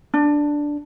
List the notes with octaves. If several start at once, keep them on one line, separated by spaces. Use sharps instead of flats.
D4